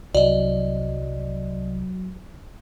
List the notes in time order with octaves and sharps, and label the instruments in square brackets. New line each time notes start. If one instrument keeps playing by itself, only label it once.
[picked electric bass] C2 [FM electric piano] F#3 [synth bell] D5 D#5